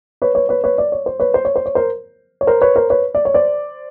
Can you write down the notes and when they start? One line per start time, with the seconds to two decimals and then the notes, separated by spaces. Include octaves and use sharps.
0.22 B4 C#5
0.35 B4 C#5
0.49 B4 C#5
0.64 B4 C#5
0.78 D5
0.92 C#5
1.06 C5
1.20 B4 C#5
1.34 C5
1.45 C#5
1.56 C5
1.66 C#5
1.75 A#4 C5
2.41 C#5
2.47 A#4 C5
2.61 B4 C#5
2.76 A#4 C5
2.90 B4 C#5
3.15 D5
3.25 C#5
3.34 C5 D5